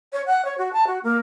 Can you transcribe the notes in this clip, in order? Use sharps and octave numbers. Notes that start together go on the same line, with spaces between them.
C#5
F#5
C#5
F#4
A5
F#4
A#3